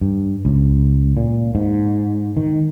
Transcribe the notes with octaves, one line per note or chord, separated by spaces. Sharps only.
G2
C#2
A#2
G#2
D#3